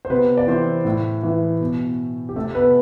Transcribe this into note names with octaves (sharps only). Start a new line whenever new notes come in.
C5
C3 B3 B4
D5
E3 C4 C5
A2
E3
B2
G4
C3 A3 A4
B3 B4